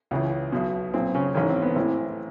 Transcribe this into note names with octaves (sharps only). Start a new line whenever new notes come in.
C#2 C#3 E3
B1 B2
B1 A#2 C4
C#3 C#4
A1 G#2 D#3 C#4
C4
B3
A1 A2 E3 C4